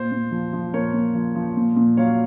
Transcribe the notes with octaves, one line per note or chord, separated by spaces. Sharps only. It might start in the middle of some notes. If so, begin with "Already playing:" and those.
Already playing: A#2 C5
A#2
F3
F3
A#2 A#4 C#5
A#2
F3
F3
A#2
A#2
F#3 C#5 F5